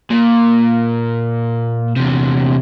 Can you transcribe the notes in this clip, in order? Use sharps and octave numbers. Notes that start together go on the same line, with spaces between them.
A#2
E2 C3